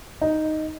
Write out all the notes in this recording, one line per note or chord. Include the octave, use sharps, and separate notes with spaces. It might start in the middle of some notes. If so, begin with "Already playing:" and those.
D#4